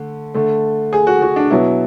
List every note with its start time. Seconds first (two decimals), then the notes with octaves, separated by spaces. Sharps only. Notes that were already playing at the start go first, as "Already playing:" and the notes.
Already playing: D3 A3
0.34 D3 A3
0.93 G#4
1.07 F#4
1.22 F#4
1.36 D4
1.50 B2 F#3 B3 E4